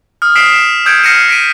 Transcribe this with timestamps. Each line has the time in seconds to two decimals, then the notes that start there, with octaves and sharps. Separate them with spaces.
0.22 D#6 F6
0.35 D#6 B6 C7 D7 E7 G7
0.52 E7
0.86 D#6 E6 G6 G#6 C#7 D7
1.03 F6 A#6 C7 C#7 D#7 E7
1.28 A#6 B6 D7 D#7